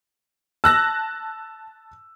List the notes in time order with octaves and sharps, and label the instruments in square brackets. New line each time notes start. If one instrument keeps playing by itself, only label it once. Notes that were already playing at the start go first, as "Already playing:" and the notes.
[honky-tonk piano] A5 F#6 A#6 [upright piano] E6